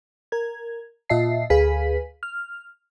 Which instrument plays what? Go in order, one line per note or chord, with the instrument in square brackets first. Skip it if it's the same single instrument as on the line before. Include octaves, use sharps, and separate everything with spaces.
[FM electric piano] A#4 G#6
A#2 F4 D#5 E5 A5 C7
D2 G#4 B4 F5 G#5 B6
F6